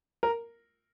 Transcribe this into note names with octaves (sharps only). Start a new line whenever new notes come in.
A#4